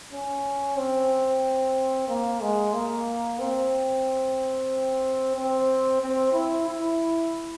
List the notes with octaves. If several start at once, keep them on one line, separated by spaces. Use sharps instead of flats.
C#4
C4
A#3
G#3
A#3
C4
C4
C4
E4
E4